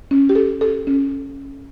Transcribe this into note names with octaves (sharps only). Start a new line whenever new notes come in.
C#4
G4
A4
A4
C#4